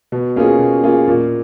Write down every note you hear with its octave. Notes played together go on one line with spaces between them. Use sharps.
B2
A#3 C#4 F4 G#4
B2
A#3 C#4 F4 G#4
A#2